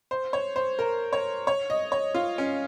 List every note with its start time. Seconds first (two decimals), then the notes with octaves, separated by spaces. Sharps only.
0.11 C5
0.33 C#5
0.56 C5
0.79 A#4
1.13 C#5
1.47 C#5
1.70 D#5
1.92 C#5
2.15 F4
2.38 C#4